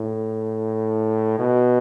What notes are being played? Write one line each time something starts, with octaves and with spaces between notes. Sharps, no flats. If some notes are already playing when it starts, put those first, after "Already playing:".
Already playing: A2
B2